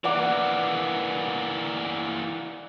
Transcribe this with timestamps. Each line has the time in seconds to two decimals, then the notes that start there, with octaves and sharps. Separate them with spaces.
0.04 E3 A#3 D5 F#5 D6